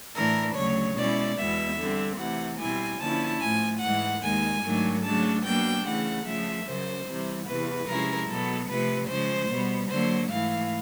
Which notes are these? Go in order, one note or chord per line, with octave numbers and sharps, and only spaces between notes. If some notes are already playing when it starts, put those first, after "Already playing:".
A2 E3 A3 D4 A#4
D2 C#3 F#3 C#5
B2 G#3 C#4 E4 D5
E2 B2 G#3 B3 E5
D3 G3 C4
C3 E3 A3 F#5
B2 G3 C4 E4 G#5
D3 F3 A#3 C#4 E4 A5
A2 F3 A3 G#5
G#2 E3 G#3 F#5
D#2 D#3 G#3 G#5
G#2 D#3 F#3 A3 D4
C#3 F#3 A3 D4 A5
B2 F#3 A#3 D4 G5
C#3 E3 A3 F#5
C#3 F3 A3 E5
F#2 C#3 F#3 C5
C3 E3 G3
E2 C3 E3 B4
C3 F3 G#3 C#4 E4 A#4
B2 F#3 B3 A4
C3 F3 A3 B4
C#3 F3 G#3 C5
B2 G3 B3
D3 F#3 A#3 C5
G#2 E3 A3 F5